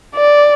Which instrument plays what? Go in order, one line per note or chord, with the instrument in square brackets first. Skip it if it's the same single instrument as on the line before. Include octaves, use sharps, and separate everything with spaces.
[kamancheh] D5